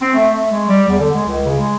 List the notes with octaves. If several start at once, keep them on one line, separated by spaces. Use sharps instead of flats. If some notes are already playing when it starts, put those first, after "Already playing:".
C4
A3
A3
G#3
G3
E2
D3
G#3
C#2
C#3
G#3